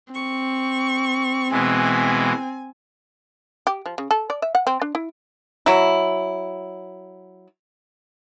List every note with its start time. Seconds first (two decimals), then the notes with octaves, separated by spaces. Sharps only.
0.14 C4 C#6
1.51 B2 E3 G#3 G#5
3.67 G4
3.86 F3
3.98 C#3
4.11 A4
4.30 D5
4.42 E5
4.55 F#5
4.67 C4
4.82 D4
4.95 E4
5.66 F#3 E4